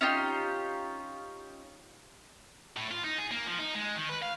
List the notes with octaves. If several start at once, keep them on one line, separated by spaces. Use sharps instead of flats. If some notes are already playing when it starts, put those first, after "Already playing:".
C#4 D#4 F4 G4
A2
F4
D#4
G#4
A#3
F3
D#4
G#3
D#3
B4
F5